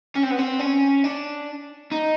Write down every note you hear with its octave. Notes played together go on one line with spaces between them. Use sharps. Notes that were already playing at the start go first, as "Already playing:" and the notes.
C#4
C4
B3
C4
C#4
D4
D#4